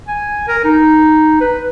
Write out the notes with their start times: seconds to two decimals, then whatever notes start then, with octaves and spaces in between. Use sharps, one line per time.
0.08 G#5
0.48 A#4
0.64 D#4
1.40 B4